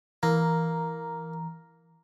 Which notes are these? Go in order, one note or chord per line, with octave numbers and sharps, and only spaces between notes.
E3 A#3 A#5